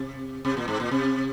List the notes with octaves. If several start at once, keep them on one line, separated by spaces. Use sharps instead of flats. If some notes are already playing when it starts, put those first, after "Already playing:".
Already playing: C3
C3
A#2
G#2
A#2
C3